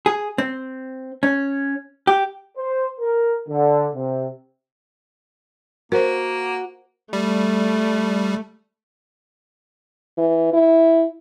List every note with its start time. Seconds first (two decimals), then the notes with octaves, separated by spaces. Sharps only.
0.06 G#4
0.38 C4
1.23 C#4
2.07 G4
2.58 C5
3.00 A#4
3.49 D3
3.95 C3
5.92 A#3 F#4 A#4 C5 F#5
7.13 G3 A3
10.17 E3
10.53 E4